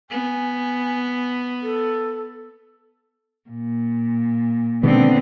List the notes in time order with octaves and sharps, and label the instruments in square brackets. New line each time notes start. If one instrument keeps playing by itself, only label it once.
[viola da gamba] B3 [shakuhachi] G#5
[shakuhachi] A4
[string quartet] A#2
[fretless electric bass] B2 D#3 G#3 [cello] D3 C4 [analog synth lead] B3